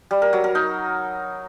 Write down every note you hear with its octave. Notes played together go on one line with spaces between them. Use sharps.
G3
A#4
F#3
A#4
D#4